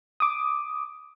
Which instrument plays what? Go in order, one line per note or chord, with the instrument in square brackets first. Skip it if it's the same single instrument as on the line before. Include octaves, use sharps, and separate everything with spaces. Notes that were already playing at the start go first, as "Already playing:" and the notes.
[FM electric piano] D6 D#6